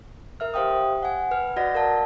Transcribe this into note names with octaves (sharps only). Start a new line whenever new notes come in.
A#4 E5 F6
G4 C5 F5 G5 D#6
F#5 G#5
B4 F6
F#4 D5 D#5 F#5 A#6
A#4 D5 F5 A5